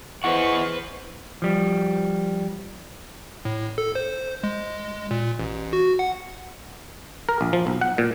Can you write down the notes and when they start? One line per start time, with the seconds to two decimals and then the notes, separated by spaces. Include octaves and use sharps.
0.24 E2 E4 G#4 B4 C5 D#5 F#5 C#6
1.42 F3 G3
3.45 A2
3.78 A4
3.95 C5
4.43 G#3
5.11 A#2
5.39 A1
5.73 F#4
5.99 F#5
7.29 A#4
7.41 A#1
7.53 F3
7.67 B1
7.81 F#5
7.98 A#2